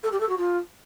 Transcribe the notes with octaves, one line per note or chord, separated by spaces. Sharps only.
A4
G4
A4
F#4
F4